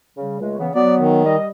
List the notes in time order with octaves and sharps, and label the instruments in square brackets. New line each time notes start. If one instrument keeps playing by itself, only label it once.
[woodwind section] C#3 G3
C#2 G#3 A3
C#3 E3 B3
[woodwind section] F#3 B3 [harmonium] D5
[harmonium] D#3
[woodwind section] G3 D#5